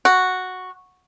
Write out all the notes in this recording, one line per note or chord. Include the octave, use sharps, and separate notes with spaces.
F#4